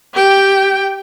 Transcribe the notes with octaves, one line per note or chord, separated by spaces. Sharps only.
G4 G5